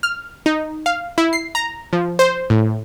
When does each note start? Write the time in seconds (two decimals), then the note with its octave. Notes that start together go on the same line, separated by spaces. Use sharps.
0.03 F6
0.46 D#4
0.86 F5
1.18 E4
1.33 C7
1.55 A#5
1.93 F3
2.19 C5
2.50 A2